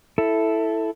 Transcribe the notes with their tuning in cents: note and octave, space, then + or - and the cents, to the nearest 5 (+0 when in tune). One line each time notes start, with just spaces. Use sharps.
E4 +0 A4 +0